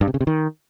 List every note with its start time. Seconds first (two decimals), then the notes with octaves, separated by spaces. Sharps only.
0.01 G2
0.08 C3
0.14 C#3
0.21 C3
0.27 D#3